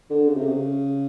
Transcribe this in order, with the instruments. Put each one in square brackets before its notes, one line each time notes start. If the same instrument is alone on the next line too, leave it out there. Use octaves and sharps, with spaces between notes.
[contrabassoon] D3
C#3
C3
C#3